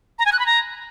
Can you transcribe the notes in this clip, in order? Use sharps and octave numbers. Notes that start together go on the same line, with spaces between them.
A#5
G#5
F#6
B5
A#5